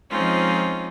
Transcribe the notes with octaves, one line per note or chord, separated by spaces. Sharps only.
F3 G#3 C4 C#4 D#4 F4